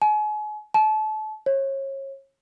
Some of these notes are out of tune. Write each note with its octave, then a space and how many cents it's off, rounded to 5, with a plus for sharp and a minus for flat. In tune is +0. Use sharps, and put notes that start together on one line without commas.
G#5 +35
A5 -30
C#5 -30